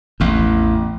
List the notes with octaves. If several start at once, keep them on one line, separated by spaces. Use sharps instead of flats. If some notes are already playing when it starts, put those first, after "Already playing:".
A1 E2